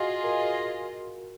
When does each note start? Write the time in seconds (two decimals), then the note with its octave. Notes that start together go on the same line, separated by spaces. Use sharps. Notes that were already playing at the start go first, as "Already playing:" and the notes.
Already playing: F4 F#4 G#4 D#5
0.24 A#4